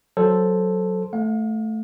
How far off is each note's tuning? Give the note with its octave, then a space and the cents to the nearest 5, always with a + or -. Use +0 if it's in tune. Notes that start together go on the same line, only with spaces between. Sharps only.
F#3 +0 A4 +0 C5 +0
A3 -5 F5 +40